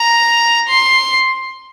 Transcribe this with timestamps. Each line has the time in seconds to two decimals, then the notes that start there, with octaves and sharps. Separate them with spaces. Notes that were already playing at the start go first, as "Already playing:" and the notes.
Already playing: A#5
0.69 C6